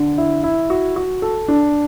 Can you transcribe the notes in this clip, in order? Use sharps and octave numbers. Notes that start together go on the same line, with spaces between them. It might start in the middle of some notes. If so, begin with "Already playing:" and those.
Already playing: D3
E4
E4
F#4
F#4
A4
D4